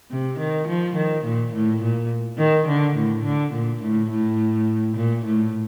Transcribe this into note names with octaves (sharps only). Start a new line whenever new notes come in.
C3
D#3
F3
D#3
A#2
A2
A#2
D#3
D3
A2
D3
A#2
A2
A2
A#2
A2